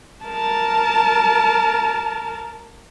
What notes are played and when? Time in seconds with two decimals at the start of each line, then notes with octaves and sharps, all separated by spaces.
0.24 A#4 A5